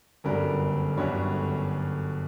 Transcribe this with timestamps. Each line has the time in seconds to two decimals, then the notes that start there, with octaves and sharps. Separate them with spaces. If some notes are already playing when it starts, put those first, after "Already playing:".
0.24 G1 F#2 D3 G3 A#4
0.97 G1 F#2 D3 G3 C#5